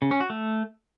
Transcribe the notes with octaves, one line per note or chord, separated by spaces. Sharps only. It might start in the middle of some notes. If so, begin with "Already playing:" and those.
C#3
C#4
F#4
A3